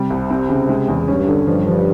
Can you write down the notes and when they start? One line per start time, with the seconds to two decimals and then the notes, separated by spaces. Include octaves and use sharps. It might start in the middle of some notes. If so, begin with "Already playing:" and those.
Already playing: C3 G3
0.10 C2
0.30 C4
0.49 C#3
0.69 G#3
0.88 E2
1.08 G2 C#4
1.27 D3
1.47 G2 F3
1.67 F3